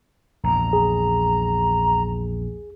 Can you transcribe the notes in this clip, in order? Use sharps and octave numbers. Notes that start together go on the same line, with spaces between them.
A#1 E2 A#5
G#4